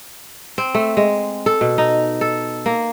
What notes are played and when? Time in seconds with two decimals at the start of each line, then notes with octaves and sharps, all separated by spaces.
0.58 C4
0.75 A3
0.97 G#3
1.46 A4
1.61 B2
1.78 D#4
2.21 A4
2.66 A#3